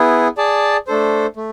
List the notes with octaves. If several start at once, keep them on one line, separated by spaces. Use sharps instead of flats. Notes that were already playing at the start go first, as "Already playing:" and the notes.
Already playing: B3 E4 G#4
G#4 D5 A5
A3 D4 A4 C5
A3